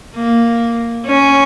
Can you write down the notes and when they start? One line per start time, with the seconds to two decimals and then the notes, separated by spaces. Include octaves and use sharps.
0.15 A#3
1.06 C#4